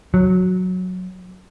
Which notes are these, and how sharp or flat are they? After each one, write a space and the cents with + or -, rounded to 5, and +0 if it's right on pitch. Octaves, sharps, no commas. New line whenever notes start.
F#3 -10